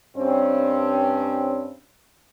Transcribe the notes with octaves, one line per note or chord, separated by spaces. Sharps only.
G2 C4 C#4